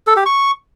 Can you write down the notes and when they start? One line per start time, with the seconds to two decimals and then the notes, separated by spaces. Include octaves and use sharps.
0.07 A4
0.16 G4
0.26 C#6